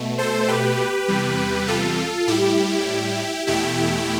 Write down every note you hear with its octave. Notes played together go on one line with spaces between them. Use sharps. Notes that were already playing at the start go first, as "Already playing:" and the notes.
Already playing: B2 A3
A4 C5
G4 B4
E2 C3 G3
F4 A4
A2 G3 E4 G4
E2 B2 A3 E4 G4